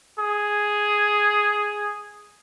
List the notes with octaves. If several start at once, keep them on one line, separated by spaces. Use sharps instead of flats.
G#4